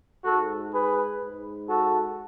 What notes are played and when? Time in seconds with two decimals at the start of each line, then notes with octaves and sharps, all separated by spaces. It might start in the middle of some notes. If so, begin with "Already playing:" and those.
0.24 G#2 F#4 A4
0.72 G#4 B4
1.21 G#2
1.68 F#4 A4